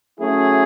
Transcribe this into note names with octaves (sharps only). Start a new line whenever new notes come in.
F#3 A3 C#4 E4 G#4